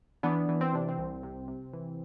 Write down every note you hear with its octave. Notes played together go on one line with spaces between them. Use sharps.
E3 B3 D4
E3
C4
C3 D4
C4
C2
C3
C3
E3